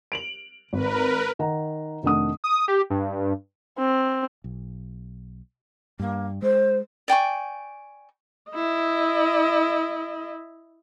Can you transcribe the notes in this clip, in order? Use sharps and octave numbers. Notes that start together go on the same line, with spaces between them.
D7 F7 F#7
G#1 A#4 B4
D#3 F#5 A#5
F1 D#3 A3 D4 F#5 D#6
D#6
G4
G2
C4
B1
G2 A#3
G#3 C5
D5 G5 G#5 C#6
E4 D#5